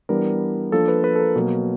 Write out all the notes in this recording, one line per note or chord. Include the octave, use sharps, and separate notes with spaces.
E3 G3 B3 D4 A#4
F3 A#3 D4 A4
B4
B4
A4
A#4
B2 F#3 A#3